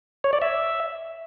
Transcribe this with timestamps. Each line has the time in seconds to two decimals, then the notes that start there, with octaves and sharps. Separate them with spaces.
0.24 C#5
0.33 D5
0.42 E5